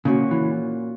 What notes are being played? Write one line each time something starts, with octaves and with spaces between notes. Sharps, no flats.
A#2 C#3 A#3 C#4 F#4
E3